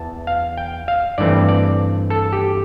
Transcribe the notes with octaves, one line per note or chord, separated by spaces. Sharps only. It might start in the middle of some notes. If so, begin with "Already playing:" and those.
Already playing: E2 E3 A5
F5
G5
F5
G2 E3 A3 C4 D5
D5
A4
G4